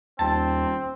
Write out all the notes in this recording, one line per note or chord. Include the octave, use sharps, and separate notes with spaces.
D#1 D#2 C4 A5